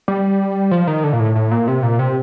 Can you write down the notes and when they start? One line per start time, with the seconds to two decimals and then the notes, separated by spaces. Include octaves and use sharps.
0.08 G3
0.71 F3
0.87 D#3
1.04 D3
1.13 A#2
1.20 A2
1.36 A2
1.51 A#2
1.68 C3
1.83 A#2
1.99 C3